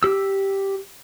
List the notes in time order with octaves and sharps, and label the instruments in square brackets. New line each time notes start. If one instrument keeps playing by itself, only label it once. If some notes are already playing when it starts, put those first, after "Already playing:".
[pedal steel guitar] G4 E6